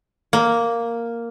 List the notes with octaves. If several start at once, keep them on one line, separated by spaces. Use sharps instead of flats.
A#3